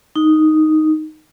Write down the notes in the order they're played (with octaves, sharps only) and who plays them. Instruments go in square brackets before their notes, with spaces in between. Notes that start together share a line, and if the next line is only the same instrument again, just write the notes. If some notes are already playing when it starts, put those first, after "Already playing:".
[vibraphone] D#4